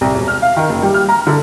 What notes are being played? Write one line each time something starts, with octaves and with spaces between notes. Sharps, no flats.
C2
E1
F6
F5
D#3
F#1
G3
F6
A#5
D3